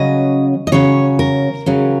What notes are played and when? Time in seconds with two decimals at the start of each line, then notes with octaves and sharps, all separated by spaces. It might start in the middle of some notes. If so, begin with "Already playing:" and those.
Already playing: C#3 F#3 C#4 D#5
0.67 D#5
0.72 C#3 F#3 C#4 C#5
1.19 A#4
1.66 C#3 F#3 C#4